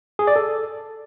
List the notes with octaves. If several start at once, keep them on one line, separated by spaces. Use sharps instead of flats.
G#4
D5
A4